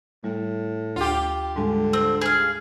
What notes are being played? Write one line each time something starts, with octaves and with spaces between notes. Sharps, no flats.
A2 G3
D2 F4 G4
G#2 D3 G3 G#3
C4
G#4 F5